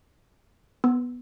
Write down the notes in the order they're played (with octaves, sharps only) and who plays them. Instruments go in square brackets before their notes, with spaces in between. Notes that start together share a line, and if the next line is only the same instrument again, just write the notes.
[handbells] B3